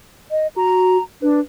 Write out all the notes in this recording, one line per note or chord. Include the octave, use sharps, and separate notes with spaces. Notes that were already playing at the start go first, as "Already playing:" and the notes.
D#5
F#4 A#5
D4 B4